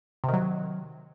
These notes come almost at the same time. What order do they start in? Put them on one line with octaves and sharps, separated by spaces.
C3 D#3 F#3